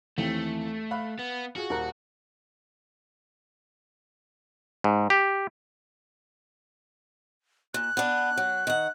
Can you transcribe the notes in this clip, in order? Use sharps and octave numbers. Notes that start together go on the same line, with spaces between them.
D#2 E3 A3 C4
F5 B5 F#6
B3
F4 F#4 G#4
D#1 A#4 F#6
G#2
G4
A#2 F#6
B3 D4
F#3
D#3 F#5